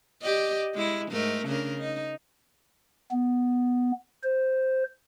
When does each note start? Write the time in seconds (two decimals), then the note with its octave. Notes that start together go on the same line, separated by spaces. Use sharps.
0.22 G4 D5 D#5
0.74 G#3 E4
1.12 G#2 A3 A#4
1.46 C#3 D4 A#4
1.79 D#4
3.11 B3
4.23 C5